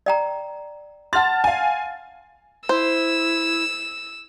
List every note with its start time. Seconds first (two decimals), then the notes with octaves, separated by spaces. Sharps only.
0.06 D5 G5 A#5
1.13 F#5 A5 C6 F6 A6
1.44 F5 G#5
2.69 E4 C5 E6